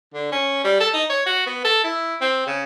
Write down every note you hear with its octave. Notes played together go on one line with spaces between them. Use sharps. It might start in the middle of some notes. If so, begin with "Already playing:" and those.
D3
C#4
G3
A4
D#4
C#5
F#4
B3
A4
E4
C4
C#3